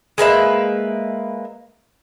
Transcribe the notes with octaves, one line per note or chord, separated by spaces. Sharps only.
G#3 A#3 B4 E5